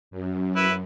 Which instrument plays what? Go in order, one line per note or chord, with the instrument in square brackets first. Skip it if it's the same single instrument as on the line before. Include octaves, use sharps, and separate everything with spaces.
[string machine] F#2
[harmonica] E4 B4